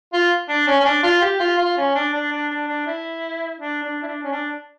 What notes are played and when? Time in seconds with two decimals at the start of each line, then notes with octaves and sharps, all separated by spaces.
0.13 F4
0.49 D4
0.67 C#4
0.80 C#4
0.85 D4
1.03 F4
1.22 G4
1.40 F4
1.58 F4
1.77 C#4
1.95 D4
2.13 D4
2.32 D4
2.49 D4
2.68 D4
2.87 E4
3.59 D4
3.83 D4
4.03 E4
4.07 D4
4.23 C#4
4.32 D4